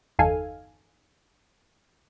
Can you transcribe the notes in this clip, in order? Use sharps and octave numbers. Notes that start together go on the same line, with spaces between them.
G1 E2 D#4 A4 F5 G#5